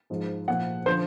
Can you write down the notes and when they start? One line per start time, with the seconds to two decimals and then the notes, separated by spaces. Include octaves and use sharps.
0.10 G#2 F3
0.48 A#2 F3 F#5
0.86 D3 F3 C5